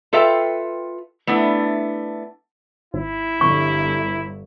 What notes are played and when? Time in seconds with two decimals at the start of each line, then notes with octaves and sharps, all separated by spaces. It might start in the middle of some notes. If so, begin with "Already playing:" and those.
0.13 F4 A4 B4 E5 F5 G5
1.27 A3 B3 D4 E4
2.94 G#1 E4
3.41 G1 C#6